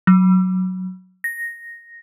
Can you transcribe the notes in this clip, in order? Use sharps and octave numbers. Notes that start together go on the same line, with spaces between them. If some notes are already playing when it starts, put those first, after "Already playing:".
F#3
A#6